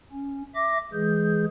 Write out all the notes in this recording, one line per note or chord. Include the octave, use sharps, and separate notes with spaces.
C#4
E5 D6 A#6
E3 G#3 G#4 G6